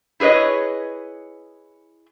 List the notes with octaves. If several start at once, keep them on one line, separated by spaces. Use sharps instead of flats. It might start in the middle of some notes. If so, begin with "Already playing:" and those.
E4 G#4 B4 C#5 D#5